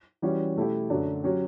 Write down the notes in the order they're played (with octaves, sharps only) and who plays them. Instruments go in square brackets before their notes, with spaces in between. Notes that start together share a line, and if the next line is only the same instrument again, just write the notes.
[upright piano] E3 G3 C#4 F#4
B2 A3 E4 G4
F#2 D3 F#3 A3 D4
F#3 C#4 G4